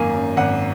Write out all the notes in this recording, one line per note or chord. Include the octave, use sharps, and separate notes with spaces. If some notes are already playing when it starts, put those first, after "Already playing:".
Already playing: G#1 F#2 D#3 A#3 G#5
F#2
G#1 F#5